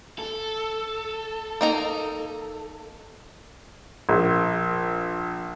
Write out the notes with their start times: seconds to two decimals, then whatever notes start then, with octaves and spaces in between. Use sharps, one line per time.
0.19 A4
1.61 A#3 D#4 A#5
4.09 A#1